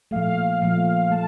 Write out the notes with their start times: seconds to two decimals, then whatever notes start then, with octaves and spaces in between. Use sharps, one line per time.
0.11 A#2 F3 A3 F5
0.62 A#2 F3 A3
1.11 A3 A5